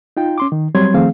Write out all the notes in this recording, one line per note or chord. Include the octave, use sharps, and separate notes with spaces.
D#4 F4 G5
C#4 C6 D6
D#3
F#3 G3 C4 C#5 C6 G#6
D#3 F3 A3 C4 G#4 F5